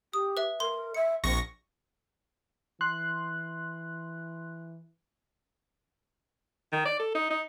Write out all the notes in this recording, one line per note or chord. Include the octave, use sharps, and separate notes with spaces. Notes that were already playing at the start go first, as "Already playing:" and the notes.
G4 D#6
B4 E5
A#4 C6
E5 C#7
A#1 C4 C#6 A#6
E3 C6 F#6
D#3
D5
A4
D#4
D#4